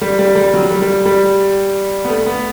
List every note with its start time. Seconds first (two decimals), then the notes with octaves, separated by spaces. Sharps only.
0.01 G3
0.19 G3
0.35 G3
0.54 F#3
0.70 G3
0.82 G3
1.05 G3
2.05 B3
2.09 A3
2.26 B3